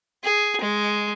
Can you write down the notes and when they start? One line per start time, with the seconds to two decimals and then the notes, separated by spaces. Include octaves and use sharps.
0.24 G#4
0.61 G#3